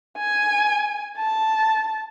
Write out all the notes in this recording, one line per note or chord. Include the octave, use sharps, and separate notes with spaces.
G#5
A5